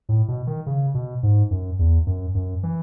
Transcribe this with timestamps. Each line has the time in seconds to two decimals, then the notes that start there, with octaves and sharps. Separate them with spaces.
0.09 A2
0.28 B2
0.47 D#3
0.66 C#3
0.94 B2
1.23 G#2
1.51 F#2
1.79 E2
2.07 F#2
2.35 F#2
2.63 E3